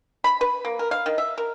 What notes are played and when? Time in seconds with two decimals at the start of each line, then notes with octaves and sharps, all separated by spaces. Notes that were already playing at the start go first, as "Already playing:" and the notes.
0.24 B5
0.41 B4
0.65 A#3
0.79 A#4
0.91 F5
1.06 D#3
1.18 E5
1.38 A#4